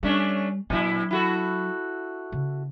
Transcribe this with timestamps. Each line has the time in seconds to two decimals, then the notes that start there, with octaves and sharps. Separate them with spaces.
0.03 G3 A3 C#4 D4
0.70 A#2 F#3 D4 E4
1.11 E4 F#4 A4
2.32 C#3